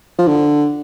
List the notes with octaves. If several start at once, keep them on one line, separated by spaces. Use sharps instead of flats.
F3
D3